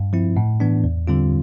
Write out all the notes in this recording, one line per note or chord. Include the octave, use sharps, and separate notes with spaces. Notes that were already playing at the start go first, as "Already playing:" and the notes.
Already playing: G2
F3 C4 E4
A2
E3 B3 D4
E2
D3 G3 C4 F4